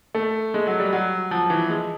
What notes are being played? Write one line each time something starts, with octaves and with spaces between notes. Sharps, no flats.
A3
G#3
F#3
G3
F#3
F3
E3
G#3